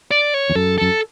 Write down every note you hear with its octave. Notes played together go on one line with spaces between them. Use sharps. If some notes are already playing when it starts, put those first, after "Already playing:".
D5
C#5
E2
F#2 A4
F#2 A4